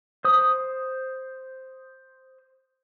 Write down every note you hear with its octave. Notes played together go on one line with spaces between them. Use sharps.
C5 D#6